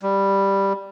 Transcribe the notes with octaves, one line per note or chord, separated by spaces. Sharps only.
G3